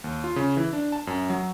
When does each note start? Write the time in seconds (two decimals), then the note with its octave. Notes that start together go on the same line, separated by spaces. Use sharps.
0.04 D#2
0.24 F4
0.36 C#3
0.57 E3
0.73 D4
0.92 A5
1.07 F#2
1.30 F#3